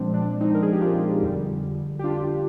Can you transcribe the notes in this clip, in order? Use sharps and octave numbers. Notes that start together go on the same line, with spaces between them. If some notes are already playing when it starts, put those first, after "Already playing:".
Already playing: A#2 F3 G#3 C4 D4
D4
C4 D#4
A#4
G#4
G4
D4 F4
F2 D3 G3
G4
D4 F4